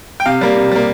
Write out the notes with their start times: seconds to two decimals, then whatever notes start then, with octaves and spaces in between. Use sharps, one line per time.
0.20 G5
0.26 C3 F5
0.41 G3 A#3
0.56 C3
0.72 G3 A#3